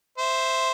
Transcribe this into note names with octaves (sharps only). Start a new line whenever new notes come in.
C5 E5